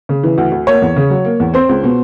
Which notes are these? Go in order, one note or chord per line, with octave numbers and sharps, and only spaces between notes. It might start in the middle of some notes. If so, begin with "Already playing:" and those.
C#3
E3
D2
D2
A#3 C#5
E2
C#3
F#3
A#3
E2
C4 C5
C#2
B2